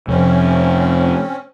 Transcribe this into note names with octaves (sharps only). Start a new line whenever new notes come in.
F2 C3 C4 C#4